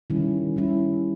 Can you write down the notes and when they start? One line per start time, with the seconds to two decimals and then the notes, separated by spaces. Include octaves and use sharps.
0.10 D#3 G3 C#4 E4
0.56 D#3 G3 C#4 E4